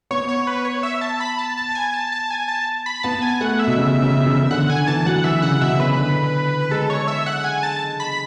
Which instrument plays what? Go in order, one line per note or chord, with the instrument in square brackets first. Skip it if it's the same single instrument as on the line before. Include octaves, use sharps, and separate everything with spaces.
[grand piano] B3 [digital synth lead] C#5
[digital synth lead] C#5
B4
C#5
E5
A5
B5
A5
A5
G#5
A5
A5
G#5
A5
B5
[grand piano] B3 [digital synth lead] A5
[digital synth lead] G#5
[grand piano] A3 [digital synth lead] F#5
[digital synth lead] E5
[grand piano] B2
C#3
C#3
C#3
C#3
[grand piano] D3 [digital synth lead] F#5
[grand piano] D3 [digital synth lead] G#5
[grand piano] E3 [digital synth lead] A5
[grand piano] F#3 [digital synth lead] F#5
[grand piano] E3 [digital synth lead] E5
[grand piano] C#3 [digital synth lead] F#5
[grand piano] B2 [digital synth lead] E5
[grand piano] C#3 [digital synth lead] B4
[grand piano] D3
[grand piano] G#3 [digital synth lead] A4
[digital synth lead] C#5
E5
F#5
G#5
A5
B5